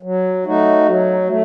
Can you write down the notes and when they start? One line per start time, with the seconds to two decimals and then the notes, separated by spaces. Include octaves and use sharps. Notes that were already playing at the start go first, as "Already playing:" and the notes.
0.02 F#3
0.45 A3 D#4 F#4
0.86 F#3
1.29 A3